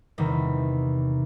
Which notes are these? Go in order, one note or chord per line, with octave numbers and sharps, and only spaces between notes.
E2 C3 D#3 G3